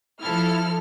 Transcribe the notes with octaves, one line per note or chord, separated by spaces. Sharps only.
F3 E4 A4 F6